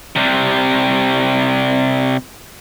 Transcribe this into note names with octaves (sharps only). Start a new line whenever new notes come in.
C3 G3